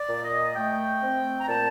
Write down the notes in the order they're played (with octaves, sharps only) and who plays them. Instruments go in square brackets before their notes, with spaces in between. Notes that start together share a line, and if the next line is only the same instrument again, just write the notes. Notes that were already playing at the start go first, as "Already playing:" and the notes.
Already playing: [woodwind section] D5
A#2
D#5
A3 G5
C4
A#5
A#2 A5